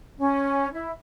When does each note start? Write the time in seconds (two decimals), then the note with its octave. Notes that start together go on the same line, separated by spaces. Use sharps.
0.19 C#4
0.73 E4